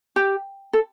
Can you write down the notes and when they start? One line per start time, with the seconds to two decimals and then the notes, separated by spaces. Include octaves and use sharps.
0.16 G4
0.73 A4